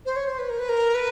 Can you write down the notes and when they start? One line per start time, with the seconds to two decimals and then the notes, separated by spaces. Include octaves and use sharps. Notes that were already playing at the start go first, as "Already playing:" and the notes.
0.05 C5
0.16 C#5
0.27 C5
0.39 B4
0.50 A#4
0.59 B4
0.69 A#4
0.94 B4